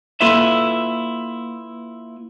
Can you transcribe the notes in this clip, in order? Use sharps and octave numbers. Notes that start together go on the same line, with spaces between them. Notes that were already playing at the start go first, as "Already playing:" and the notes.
A#3 E4 F4 A4 B4 E5